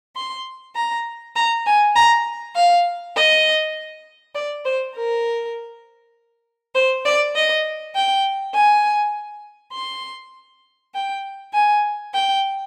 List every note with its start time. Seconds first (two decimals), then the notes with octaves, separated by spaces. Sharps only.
0.16 C6
0.76 A#5
1.35 A#5
1.66 G#5
1.96 A#5
2.55 F5
3.16 D#5
4.35 D5
4.65 C5
4.96 A#4
6.75 C5
7.05 D5
7.35 D#5
7.95 G5
8.55 G#5
9.74 C6
10.94 G5
11.54 G#5
12.14 G5